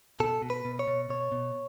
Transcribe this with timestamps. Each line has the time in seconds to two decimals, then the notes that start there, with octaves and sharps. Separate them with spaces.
0.20 B2 A4
0.42 B2
0.50 B4
0.65 B2
0.79 C#5
0.88 B2
1.09 B2 C#5
1.32 B2